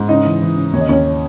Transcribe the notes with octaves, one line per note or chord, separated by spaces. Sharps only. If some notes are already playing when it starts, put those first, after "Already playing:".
Already playing: G#2
C#3 D#4 D#5
E3
E3
C#3
D#2 C#5
D#5
D#2 C#4 C#5